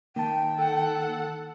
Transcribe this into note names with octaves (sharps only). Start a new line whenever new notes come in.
D#3 A#3 G5 A5
A4 F#5